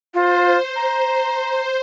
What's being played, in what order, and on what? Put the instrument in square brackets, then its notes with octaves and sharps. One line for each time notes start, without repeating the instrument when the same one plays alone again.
[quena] F4 [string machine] C5
[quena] A#5